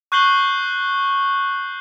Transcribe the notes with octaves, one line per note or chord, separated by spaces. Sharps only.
C#6 F#6 G6 C7 F#7 G7